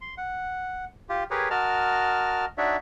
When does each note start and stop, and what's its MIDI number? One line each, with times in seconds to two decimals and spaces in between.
0.01 0.15 84
0.18 0.85 78
1.09 1.24 65
1.09 1.24 67
1.31 1.49 67
1.31 1.49 68
1.31 1.49 70
1.31 1.49 71
1.31 1.49 73
1.50 2.45 66
1.50 2.45 70
1.50 2.45 75
1.50 2.45 81
1.50 2.45 89
2.58 2.77 62
2.58 2.77 63
2.58 2.77 66
2.58 2.77 73
2.58 2.77 74
2.58 2.77 76